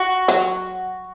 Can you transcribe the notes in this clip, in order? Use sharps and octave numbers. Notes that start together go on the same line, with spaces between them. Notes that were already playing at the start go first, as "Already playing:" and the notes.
Already playing: F#4
F#3